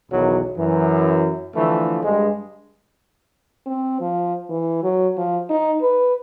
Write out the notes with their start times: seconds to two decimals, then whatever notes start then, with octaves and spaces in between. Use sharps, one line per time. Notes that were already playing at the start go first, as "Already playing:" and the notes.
0.12 B1 E2 D#3 F#3
0.57 F#2 E3
1.56 D3 E3 F3 A3
2.03 G2 G#3
3.66 C4
4.01 F3
4.49 E3
4.83 F#3
5.17 F3
5.50 D#4
5.81 B4